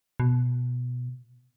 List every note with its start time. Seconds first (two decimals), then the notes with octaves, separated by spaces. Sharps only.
0.20 B2